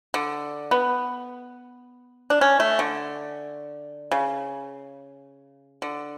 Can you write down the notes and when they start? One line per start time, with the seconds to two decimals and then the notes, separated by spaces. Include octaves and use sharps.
0.14 D3
0.71 B3
2.30 D4
2.41 C#4
2.60 A3
2.79 D3
4.12 C#3
5.82 D3